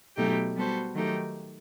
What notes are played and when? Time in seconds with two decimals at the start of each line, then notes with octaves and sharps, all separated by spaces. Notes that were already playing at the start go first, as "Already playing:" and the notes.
0.16 B2 F#3 A3 D#4 G4
0.56 G3 B3 F#4 A4 C5
0.95 D#3 F#3 A3 D#4 G4